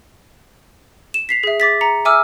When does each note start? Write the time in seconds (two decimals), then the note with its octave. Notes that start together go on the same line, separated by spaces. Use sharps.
1.14 E7
1.29 B6 C7 F7
1.43 G#4 E5
1.60 D6 A6 B6
1.81 A#5 C#7
2.05 E5 G#5 D6 E6 F6